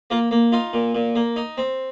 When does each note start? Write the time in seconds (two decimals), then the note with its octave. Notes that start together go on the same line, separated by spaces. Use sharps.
0.10 A#3 F4 A#4
0.31 A#3
0.52 D#4 F4
0.73 A#2
0.95 A#2
1.15 A#3
1.36 D#4
1.58 C4